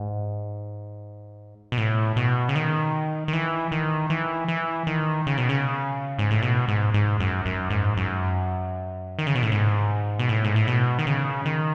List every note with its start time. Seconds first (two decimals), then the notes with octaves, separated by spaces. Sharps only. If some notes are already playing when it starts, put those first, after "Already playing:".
Already playing: G#2
1.72 B2
1.78 A2
2.16 B2
2.49 C#3
2.55 D#3
3.28 D#3
3.33 E3
3.72 D#3
4.10 E3
4.48 E3
4.87 D#3
5.27 C#3
5.38 B2
5.49 C#3
6.19 G#2
6.31 A2
6.42 B2
6.68 G#2
6.94 G#2
7.20 F#2
7.46 F#2
7.70 G#2
7.97 F#2
9.19 D#3
9.27 C#3
9.35 B2
9.43 A2
9.52 G#2
10.19 B2
10.29 A2
10.44 G#2
10.56 A2
10.67 B2
10.99 D#3
11.07 C#3
11.45 D#3